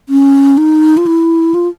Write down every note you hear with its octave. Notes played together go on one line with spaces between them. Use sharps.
C#4
D#4
F4
E4
F4